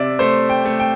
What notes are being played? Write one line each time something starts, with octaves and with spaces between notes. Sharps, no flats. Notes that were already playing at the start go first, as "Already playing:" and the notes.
Already playing: C3 D5 E5
A3 C5
G5
A3
G5